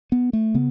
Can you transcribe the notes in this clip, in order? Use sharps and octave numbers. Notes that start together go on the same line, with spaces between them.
B3
A3
C#3 B3